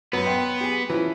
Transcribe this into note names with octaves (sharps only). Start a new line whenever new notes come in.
F#2 F#3 B3 B4
F#5 G5 C6
G4 G#4
E3 F3 C#4